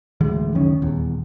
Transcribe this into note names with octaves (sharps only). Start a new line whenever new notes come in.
D1 D2 E3 G#3
C#2 F#2 D#3 C#4
D#1 E2